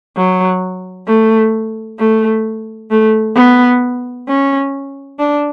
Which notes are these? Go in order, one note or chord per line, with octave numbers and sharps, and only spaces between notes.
F#3
A3
A3
A3
B3
C#4
D4